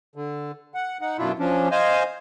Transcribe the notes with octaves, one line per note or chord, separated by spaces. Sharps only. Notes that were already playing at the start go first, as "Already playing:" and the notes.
D3
F#5
D#4 F#5
F#2 B2 D4 E4 F4
F3 C#4 D4
C5 D#5 F5 G#5